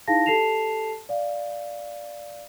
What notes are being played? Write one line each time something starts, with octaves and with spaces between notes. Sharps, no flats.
D#4 E4 G#4 F5 A5 A#6
G4 A4 A5 C7 E7 F7
D5 F5